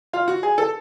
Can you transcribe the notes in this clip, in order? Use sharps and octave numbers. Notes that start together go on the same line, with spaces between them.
F4
F#4
G#4
A4